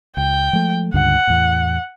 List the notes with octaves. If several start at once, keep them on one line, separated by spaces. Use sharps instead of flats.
C#2 G5
F3 G#3 A3
C#2 G2 D3 F#5
E2 A2